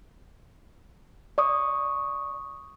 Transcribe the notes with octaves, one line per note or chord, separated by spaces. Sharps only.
D5 C#6 D#6